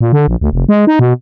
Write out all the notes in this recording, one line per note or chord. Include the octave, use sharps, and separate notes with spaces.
A#2
D3
A#1
D2
F1
G#3
D#4
B2